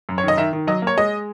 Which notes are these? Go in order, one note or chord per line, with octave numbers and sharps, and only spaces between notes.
F#2
C#5
D#3 D#5
D#3 E5
D#3
F#3 D#5
A#3 C#5
G#3 D#5